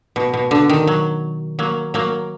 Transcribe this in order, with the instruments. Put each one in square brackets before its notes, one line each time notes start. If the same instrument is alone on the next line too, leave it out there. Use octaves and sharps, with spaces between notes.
[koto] B2
B2
D3
D#3
F#3
F#3 A#3
F#3 A#3